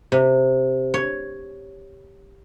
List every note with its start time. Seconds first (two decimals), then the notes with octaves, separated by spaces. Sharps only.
0.12 C3
0.94 C#5